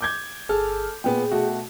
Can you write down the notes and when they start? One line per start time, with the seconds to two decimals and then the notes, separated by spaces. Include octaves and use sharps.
0.01 D6 G6 G#6
0.49 G1 G#4 A4 F6
1.04 A#2 B3 G#4 G5
1.32 B2 A3 F#4